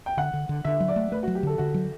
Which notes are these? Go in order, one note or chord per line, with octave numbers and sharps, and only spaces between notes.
G5
D3 F#5
D3
D3
D3 E5
F#3
D5
A3
A3 B4
F#4
F#3
G4
D3 A4
D3 F#4
F#3